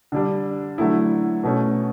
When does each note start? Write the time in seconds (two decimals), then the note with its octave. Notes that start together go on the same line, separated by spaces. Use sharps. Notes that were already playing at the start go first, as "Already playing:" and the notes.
0.12 D3 G3 D4
0.78 D3 F#3 A3 E4
1.44 B2 A3 C#4